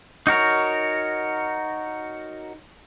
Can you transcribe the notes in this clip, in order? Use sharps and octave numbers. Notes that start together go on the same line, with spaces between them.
D#4 F#4 A#4 C#5